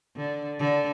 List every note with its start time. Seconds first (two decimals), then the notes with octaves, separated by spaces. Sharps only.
0.16 D3
0.59 D3